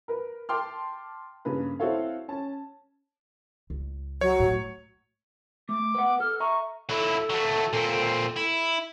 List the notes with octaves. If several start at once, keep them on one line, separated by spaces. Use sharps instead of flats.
A#4 B4
G5 A5 C6 D6 F6
G2 C#3 A#3 B4
C4 E4 F#4 A4 C#5 F5
C#4 A5
C#2
F#3 C#5
A2
A3 D6
B4 F#5
A4 F6
E5 A#5 C#6
F#3 E4 A4
F#3 A3
A#2 C4
E4